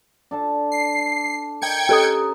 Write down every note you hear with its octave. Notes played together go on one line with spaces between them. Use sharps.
D4 A4 A5
C7
A#4 D#5 G5 G#6 C#7
C#4 G4 A4 A#4 D#6